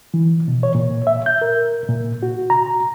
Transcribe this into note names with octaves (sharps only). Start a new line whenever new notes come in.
E3
B2
C#5
A#2
E5
G6
A#4
A#2
F#4
A#5